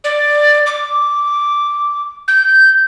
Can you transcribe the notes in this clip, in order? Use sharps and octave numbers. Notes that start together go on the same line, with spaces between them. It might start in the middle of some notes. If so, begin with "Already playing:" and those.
D5
D6
G6